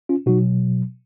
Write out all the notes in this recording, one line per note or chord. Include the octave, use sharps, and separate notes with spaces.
C#4 F4
B2 F#3 D#4 F#4